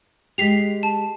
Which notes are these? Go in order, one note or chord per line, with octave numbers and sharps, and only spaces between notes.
G#3 G4 B6 C7 F7
A5